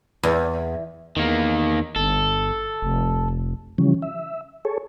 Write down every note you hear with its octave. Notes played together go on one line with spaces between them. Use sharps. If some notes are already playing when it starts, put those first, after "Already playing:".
E2
E2 D#3 A#3
G1 A4
F1
C#3 E3 F3 G3 C#4
E5
G#4 A4 C#5